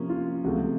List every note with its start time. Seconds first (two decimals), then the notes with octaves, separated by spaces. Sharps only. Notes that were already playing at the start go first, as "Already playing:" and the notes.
Already playing: C3 F3 A#3 C#4
0.09 F4
0.44 C#2 C3 F3 A3 C4 F#4